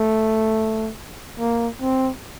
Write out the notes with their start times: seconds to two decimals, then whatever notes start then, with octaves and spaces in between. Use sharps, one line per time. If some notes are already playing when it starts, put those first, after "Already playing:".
Already playing: A3
1.40 A#3
1.82 C4